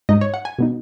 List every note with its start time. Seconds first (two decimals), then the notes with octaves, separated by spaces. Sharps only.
0.09 G#2 G#3 D#4 D#5
0.21 C#5
0.34 F#5
0.45 G#5
0.59 B2 B3 D#4